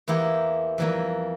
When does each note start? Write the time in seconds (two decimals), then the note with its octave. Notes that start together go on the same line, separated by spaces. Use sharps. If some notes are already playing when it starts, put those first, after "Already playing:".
0.08 E2 E3 A#3 E4 G4
0.78 F2 E3 G3 A#3